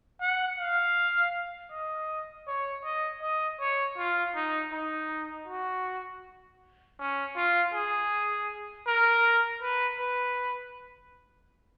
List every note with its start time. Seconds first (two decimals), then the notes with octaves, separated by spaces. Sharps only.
0.21 F#5
0.59 F5
1.72 D#5
2.47 C#5
2.84 D#5
3.22 D#5
3.60 C#5
3.98 F4
4.35 D#4
4.72 D#4
5.48 F#4
6.99 C#4
7.36 F4
7.74 G#4
8.87 A#4
9.61 B4
9.99 B4